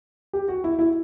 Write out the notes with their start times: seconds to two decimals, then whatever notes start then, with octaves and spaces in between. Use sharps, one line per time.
0.33 G4
0.48 F#4
0.64 E4
0.79 E4